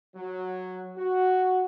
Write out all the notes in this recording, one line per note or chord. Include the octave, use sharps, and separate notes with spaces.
F#3
F#4